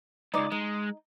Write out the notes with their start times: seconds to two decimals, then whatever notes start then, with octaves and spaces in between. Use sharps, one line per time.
0.34 C#2 G#2 D#4 D5
0.52 G#3 D#4